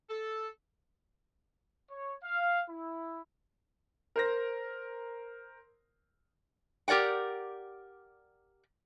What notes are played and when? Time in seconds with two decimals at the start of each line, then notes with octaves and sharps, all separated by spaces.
0.10 A4
1.91 C#5
2.24 F5
2.69 E4
4.16 A#4 C5 A#6
6.88 G4 A#4 D5 F#5 G5